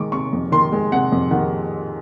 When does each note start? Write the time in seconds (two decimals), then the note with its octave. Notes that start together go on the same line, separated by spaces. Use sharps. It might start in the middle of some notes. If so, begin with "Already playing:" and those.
Already playing: D#3 G#3 C#6 D6
0.12 C3 C#6
0.33 F2
0.52 D#3 C6
0.72 G#3
0.92 C3 F#5
1.12 F2
1.31 D#3 F#5